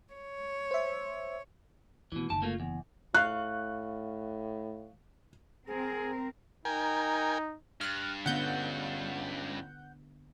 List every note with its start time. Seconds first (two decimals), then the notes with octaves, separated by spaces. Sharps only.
0.13 C#5
0.71 C5 E5
2.12 B2 D#3 E3 A3
2.30 F#1 D3 D#3 A5
2.42 A3 A#3 F4
2.60 E2
3.14 A2 F5 C#6 F#6
5.67 C4 G#4 A#4
6.65 D#4 A#4 G5 G#5
7.81 G2 F6 F#6
8.26 D3 B3 C#4 F4 F#5 G6